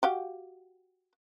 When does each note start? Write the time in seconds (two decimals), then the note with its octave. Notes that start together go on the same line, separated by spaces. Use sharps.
0.03 F#4 G4 F5